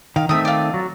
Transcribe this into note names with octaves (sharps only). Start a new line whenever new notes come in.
D#3 F5
D#3 A3 C4 E5 D#6
F4 D5
F#3